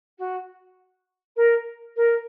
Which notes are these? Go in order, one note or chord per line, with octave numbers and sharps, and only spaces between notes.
F#4
A#4
A#4